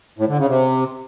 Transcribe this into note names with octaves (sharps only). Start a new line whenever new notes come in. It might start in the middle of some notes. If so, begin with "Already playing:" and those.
A2
D3
C#3
C3